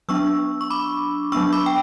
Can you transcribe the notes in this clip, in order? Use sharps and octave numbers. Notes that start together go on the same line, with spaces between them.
F#3 B3 D4 C#6 E6
C#6
B5 D6
F#3 B3 D4 C#6 E6
B5 D6
G5